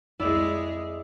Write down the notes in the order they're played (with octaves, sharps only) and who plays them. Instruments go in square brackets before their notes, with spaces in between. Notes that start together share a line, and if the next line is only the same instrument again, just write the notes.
[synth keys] C2 F2 [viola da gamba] G#3 G#4 [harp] E4 D5